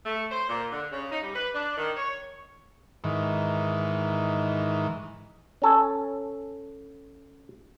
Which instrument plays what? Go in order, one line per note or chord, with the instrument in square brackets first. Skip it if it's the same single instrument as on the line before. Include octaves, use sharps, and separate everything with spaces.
[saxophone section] A3
C5
A#2
D3
C#3
D#4
G3
B4
D4
D#3
C#5
[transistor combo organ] G#2 D#3 E3
[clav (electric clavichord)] C#4 A4 G#5